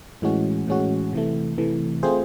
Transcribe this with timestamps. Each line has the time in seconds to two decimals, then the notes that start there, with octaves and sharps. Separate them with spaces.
0.22 A2 E3 G#3 C#4 F#4
0.67 A2 E3 G#3 C#4 F#4
1.13 C3 E3 A3
1.58 C3 E3 A3
2.03 A3 C4 F4 G#4 C5